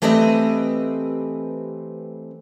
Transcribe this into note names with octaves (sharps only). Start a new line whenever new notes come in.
E3 A3 C4 G4 B4 D#5